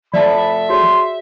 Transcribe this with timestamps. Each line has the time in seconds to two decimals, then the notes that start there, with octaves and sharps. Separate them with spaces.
0.13 F3 A3 D5 E5 A5 B5
0.70 F#4 G#4 C#5 C6